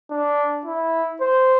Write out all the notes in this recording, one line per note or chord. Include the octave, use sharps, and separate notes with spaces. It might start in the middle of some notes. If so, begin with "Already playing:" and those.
D4
E4
C5